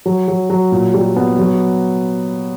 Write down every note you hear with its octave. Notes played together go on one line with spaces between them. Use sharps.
F#3
F#3
F#3
A#2
G3
B3
F#3